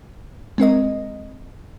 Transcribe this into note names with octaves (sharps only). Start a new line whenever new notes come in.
G#3 C4 A#4 D#5